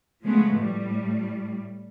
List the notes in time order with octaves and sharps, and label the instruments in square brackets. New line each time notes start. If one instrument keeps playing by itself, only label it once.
[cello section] C#3 F3 G#3 A3 B3
A2 G3